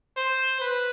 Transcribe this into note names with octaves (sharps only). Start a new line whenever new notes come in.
C5
B4